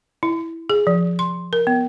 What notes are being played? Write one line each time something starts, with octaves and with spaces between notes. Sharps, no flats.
E4
G#4
F3
C6
A#4
B3